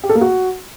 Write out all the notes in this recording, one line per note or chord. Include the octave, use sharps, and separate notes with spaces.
G4
A4
A#3
F#4